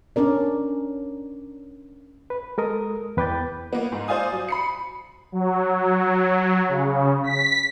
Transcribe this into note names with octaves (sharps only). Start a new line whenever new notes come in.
C#4 D4 A#4 D5
B4
G#3 A4 A#4 D#6
E2 B4 G5 D6 G6 A6
A#3 B3
G#2
C5 D5 F5 G#5 D#6
F#3
B5 C7 C#7
F#3
F#3
C#3
B6